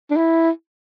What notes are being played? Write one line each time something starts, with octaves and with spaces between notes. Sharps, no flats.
D4
E4